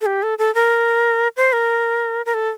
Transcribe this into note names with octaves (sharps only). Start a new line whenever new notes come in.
A4
G4
A4
A4
A#4
C5
A#4
A#4
A4